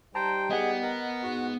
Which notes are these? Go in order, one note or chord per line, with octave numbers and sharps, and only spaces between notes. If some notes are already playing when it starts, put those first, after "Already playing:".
G3 D#4 G4 C5 G5 A5 A#5
B3 G#4 D#5 F#5
A#4
G#2 F#4